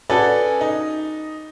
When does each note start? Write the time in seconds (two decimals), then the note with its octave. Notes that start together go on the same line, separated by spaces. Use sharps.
0.10 C#4 F#4 G#4 A4 B4 D5
0.61 D#4